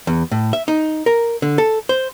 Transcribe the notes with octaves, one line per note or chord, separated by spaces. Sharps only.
E2
A2
E5
D#4
A#4
D3
A4
C5